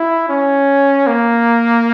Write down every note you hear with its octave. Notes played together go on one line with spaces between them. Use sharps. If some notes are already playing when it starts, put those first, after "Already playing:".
Already playing: E4
C#4
A#3